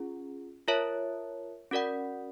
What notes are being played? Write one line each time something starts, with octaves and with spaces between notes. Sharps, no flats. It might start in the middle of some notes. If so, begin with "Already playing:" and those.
Already playing: C#4 F4 G#4
F4 A#4 C#5 E5 A5
C#4 F#4 A#4 D5 F#5